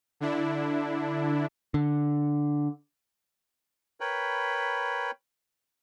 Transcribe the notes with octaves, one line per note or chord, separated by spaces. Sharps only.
D3 D4 E4
D3
A#4 B4 C#5 G5 B5